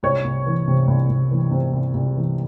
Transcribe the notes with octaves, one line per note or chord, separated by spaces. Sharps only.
C2 C#5
C2
E3
C3
C2
C2
E3
C3
C2
C2
E3